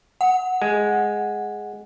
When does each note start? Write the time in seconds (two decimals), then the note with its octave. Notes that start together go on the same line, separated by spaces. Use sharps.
0.21 F#5
0.62 G#3